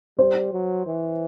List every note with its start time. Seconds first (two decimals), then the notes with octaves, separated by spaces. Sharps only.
0.19 G3 C5
0.53 F#3
0.86 E3